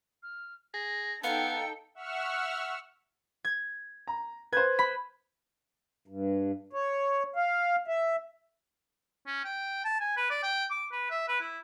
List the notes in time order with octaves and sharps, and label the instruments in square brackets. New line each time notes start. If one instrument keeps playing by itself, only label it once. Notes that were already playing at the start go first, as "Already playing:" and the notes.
[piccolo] F6
[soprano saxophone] G#4 [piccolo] A#6
[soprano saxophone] B3 [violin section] D#4 A4 G5 [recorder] F5 [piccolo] C#7
[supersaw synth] E5 F#5 C#6 E6 F6
[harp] G#6
[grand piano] A#5
[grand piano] B4 C5 [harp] G#6
[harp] B5
[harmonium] G2
C#5
F5
E5
[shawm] C#4
G5
A5
G#5
B4
D5
G5
D6
B4
E5
B4
E4